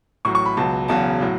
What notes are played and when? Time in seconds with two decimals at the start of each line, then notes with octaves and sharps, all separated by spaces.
0.25 A1 A2 F#3 C#6
0.35 C#6
0.46 B5
0.57 C#2 B2 F#3 A5
0.88 E1 E2 C#3 F#3 A5
1.21 A2 F#3